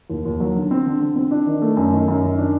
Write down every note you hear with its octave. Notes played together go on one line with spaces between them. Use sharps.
D#2
D#2
F#3
D3
C4
D3
D3
C4
D4
D#3
A3
F#2
D#3
F#2
D#3
D4